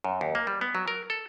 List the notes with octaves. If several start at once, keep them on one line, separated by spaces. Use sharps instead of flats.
F#2
D#2
A#3
G3
B3
F#3
A#4
A4